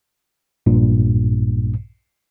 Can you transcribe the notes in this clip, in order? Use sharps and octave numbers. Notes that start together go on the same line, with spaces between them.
A#1 G2 A#2